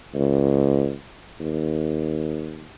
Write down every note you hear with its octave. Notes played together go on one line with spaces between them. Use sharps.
C#2
D#2